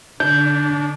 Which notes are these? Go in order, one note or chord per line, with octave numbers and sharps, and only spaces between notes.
D3 D4 G6